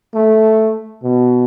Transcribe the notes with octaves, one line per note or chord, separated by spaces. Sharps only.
A3
B2